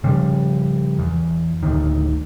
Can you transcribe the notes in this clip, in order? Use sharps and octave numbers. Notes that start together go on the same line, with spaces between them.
C#3 F3 G3
E2
D1 D2 D#3